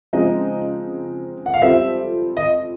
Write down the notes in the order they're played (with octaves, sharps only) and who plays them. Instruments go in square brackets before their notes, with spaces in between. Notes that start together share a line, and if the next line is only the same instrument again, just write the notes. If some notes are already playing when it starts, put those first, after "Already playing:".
[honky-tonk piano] C#3 F3 G#3 C4 D#4 [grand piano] D#5
[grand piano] F#5
F5
[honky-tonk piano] G3 C4 F4 A4 C5 [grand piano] E5
[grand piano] D#5